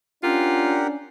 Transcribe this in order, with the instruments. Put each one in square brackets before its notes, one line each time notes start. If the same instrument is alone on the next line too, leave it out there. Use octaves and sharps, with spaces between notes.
[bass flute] C#4 [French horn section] D4 [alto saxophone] F4 [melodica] G4 A#4 F#5